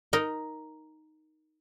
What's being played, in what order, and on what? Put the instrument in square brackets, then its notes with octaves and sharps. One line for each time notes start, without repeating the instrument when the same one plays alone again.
[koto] D#4 A#4 D#5